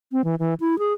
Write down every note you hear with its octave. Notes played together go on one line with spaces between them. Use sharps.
C4
E3
E3
E4
G#4